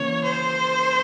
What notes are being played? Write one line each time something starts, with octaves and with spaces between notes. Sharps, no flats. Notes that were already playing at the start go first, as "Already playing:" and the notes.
Already playing: C#3 E3 A#3 C#5
C5